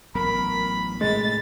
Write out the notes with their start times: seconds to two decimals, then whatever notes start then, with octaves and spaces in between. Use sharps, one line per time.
0.15 A1 F#3 B3 A#4 B5
1.01 A2 C3 G#3 A3 A6